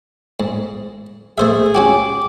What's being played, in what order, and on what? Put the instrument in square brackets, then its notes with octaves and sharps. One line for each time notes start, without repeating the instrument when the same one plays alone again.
[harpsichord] G#2
[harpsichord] A3 C5 E5 [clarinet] G#4
[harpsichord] C#4 F#4 G4 [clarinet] D6